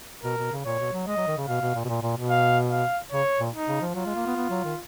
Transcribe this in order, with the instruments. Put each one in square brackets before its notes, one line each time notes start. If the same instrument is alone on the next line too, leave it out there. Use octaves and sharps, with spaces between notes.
[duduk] B2 [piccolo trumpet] A#4
[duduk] B2
C#3
[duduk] A#2 [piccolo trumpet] C#5
[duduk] B2
F#3
[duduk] G#3 [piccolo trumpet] D#5
[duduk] F#3
D#3
C#3
[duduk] B2 [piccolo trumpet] F5
[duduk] B2
A#2
B2
A#2
A#2
B2
[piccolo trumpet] F5
F5
[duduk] C#3 [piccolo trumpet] C#5
[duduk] A#2
[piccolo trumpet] D#4
[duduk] C#3
F3
[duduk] F#3 [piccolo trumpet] F4
[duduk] G#3
A#3
B3
B3
F#3
D#3